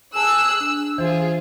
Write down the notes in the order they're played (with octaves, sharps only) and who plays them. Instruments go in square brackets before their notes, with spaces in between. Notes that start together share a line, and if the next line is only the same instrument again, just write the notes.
[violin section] G#4 E6 F#6 [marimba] G#5 A5
[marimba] D4 [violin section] E6
[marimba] E3 C5 [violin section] F4 G#4